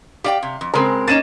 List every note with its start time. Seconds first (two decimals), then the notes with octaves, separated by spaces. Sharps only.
0.24 G4 D5 F5 G5
0.43 C3
0.61 F2
0.74 C#3 G#3 C4 A#4
1.08 A#3 C#4 D#4 A6 D#7 E7